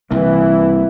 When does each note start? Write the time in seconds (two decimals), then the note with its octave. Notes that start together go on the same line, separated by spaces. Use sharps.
0.11 C2 C3 E3 A#3